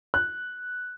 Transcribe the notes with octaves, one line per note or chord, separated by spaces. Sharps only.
F#6